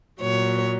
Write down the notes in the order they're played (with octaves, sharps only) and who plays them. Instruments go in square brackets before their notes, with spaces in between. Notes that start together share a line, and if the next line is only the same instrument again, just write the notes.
[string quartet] A#2 F#3 C#5